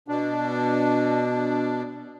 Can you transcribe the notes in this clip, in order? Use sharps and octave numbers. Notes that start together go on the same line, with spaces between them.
B2 D4